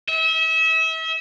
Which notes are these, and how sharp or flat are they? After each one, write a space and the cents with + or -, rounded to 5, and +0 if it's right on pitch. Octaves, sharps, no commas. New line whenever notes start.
E5 -35